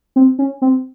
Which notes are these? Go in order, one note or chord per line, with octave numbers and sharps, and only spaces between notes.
C4
C#4
C4